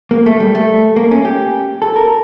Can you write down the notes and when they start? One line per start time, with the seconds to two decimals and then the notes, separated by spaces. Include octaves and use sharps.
0.11 A#3
0.26 A3
0.40 G3
0.55 A3
0.96 A#3
1.11 C#4
1.25 G4
1.82 A4
1.96 A#4